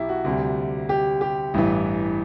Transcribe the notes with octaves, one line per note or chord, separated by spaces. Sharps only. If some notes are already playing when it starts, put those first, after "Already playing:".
Already playing: B1 E4 G4
F#4
D2 C3 G3
G4
G4
A1 G2 E3